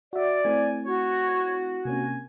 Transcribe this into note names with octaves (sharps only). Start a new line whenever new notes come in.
F#4 D5 E5
A3 C4 E4 G#5
F#4 C#5
C3 A#3 C#4 G#5